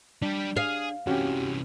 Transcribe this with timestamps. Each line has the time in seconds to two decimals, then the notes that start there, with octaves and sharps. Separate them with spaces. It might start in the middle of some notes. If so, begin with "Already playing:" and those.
0.22 G3 D4 G4
0.57 G#4 F5
1.07 C3 E3 C#4 F#4 G4